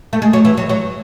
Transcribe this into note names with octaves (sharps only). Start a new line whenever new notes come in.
A3
G#3
F#3
E3
F#3
F#3